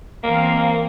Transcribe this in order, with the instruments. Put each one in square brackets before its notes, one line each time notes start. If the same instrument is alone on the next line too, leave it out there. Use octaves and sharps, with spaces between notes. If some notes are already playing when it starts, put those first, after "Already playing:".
[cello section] E3 C4 F5 [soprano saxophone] A#3